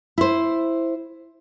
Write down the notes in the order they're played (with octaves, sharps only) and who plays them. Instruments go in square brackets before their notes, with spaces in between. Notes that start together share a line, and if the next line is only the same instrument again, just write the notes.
[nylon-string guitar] E4 C5